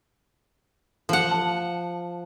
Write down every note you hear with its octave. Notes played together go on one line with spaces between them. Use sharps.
F3 F#5
A5